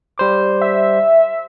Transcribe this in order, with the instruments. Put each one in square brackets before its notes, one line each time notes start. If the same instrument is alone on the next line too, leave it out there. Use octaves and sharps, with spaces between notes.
[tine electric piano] G3 C5 D6
[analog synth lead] E5